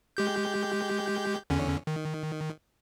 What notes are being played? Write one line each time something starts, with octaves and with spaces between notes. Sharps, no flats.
G#3 G4 G6
E2 D3 C#4
D#3